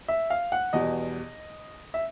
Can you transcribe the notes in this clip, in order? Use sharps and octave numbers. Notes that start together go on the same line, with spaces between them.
E5
F5
F#5
E2 B2 G3 D#5
E5